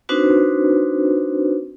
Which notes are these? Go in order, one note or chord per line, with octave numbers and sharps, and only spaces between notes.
C4 D4 D#4 F#4 B4 C5